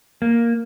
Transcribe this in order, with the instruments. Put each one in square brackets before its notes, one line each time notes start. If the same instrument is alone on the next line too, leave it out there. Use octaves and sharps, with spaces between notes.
[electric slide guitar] A#3